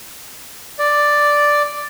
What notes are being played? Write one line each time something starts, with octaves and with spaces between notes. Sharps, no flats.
D5